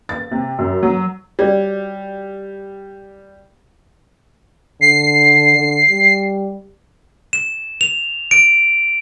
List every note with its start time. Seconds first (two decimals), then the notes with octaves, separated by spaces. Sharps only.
0.09 A6
0.31 C3
0.59 F#2
0.83 F#3
1.39 G3 F#4 C#5 D5
4.81 D3 C7
5.55 D3
5.90 G3
7.33 E7
7.81 F7
8.31 D7